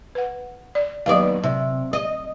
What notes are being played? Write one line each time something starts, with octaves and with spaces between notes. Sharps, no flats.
B4 F#5
D5
D#2 F#3 B3 D5 F5
C3
D#5